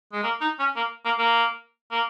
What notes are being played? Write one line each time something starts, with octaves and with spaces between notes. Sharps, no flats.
G#3
A#3
D#4
C#4
A#3
A#3
A#3
A#3